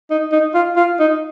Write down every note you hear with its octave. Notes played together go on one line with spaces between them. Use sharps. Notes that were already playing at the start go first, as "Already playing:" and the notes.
D#4
D#4
F4
F4
D#4